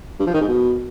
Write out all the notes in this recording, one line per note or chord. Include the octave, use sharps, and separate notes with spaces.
G2
F3
D#3
G#2
B2